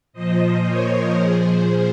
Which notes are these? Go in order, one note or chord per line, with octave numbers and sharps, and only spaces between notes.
A#2 F3 C5 D#5
A#4 C#5
A#2 F3 G#4 C5